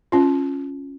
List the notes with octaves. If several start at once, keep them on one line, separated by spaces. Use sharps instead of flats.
C#4 F4